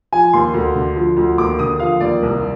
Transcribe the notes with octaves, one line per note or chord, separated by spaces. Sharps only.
F3 G#5
D#2 C6
D2
D3
F3
D2
D#2 D6
D3 D#6
F3 F5
D#2 D5
C2